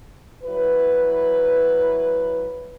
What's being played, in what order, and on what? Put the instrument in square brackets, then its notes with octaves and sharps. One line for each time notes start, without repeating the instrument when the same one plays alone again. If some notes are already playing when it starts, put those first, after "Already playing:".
[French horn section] F#3 E4 B4